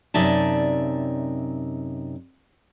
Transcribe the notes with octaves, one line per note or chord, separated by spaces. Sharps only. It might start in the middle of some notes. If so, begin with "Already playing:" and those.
F#2 C3 D#4 D5 E5 A5